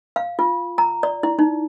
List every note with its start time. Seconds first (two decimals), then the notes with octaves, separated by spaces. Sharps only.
0.16 F5
0.39 F4
0.78 A#5
1.03 D5
1.23 E4
1.39 D#4